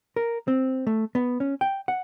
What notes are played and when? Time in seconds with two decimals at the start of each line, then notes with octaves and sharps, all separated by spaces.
0.16 A#4
0.48 C4
0.87 A3
1.15 B3
1.40 C#4
1.61 G5
1.88 F#5